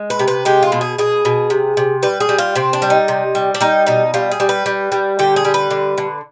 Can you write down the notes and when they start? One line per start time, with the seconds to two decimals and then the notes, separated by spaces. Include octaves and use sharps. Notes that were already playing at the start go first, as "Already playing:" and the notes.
Already playing: G#3
0.10 B4
0.19 C3
0.28 B4
0.45 G#3 G4
0.63 F4
0.72 B2
0.81 G#4
0.98 B2 G#4
1.25 B2
1.50 C3
1.77 C3
2.03 G3 B4
2.20 G#4
2.29 G3
2.38 F4
2.55 C3 C4
2.73 D4
2.82 G3
2.90 D#4
3.08 C3
3.35 G3
3.54 D4
3.61 G3 D#4
3.86 B2 D#4
4.14 G3 F4
4.31 G#4
4.40 G3
4.49 B4
4.66 G3
4.92 G3
5.19 D3 G4
5.36 G#4
5.45 G3
5.54 B4
5.71 D3
5.98 D3